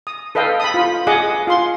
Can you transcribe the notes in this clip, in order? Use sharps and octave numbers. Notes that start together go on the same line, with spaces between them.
D#6
A4 B4 D#5 F5 G5
B5 D#6
F4 B5
G#4 D#5 F#5 D6
F4 C6